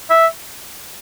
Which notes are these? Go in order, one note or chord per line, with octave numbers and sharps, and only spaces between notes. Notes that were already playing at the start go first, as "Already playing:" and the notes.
E5